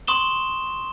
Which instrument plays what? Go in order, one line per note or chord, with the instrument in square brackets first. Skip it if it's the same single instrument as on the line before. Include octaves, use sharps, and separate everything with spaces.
[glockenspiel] C6 C#6 D#6 E7 G7